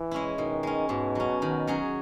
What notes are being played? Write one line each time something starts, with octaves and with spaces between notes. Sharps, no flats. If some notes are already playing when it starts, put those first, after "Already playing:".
Already playing: E3
G#3 C#4 E4
B2 D#3
G#3 C#4
G#2 B2
F#3 C#4
D#3
F#3 C#4 G#4